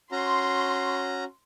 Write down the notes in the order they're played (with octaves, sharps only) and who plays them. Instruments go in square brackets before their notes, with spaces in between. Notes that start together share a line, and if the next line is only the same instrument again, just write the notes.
[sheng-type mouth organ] C#4 F#4 A#5 [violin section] C6